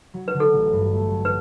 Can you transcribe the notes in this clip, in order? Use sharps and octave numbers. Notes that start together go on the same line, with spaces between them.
F#3
B4
D3
A4
A1
G2
A3
F#3
B4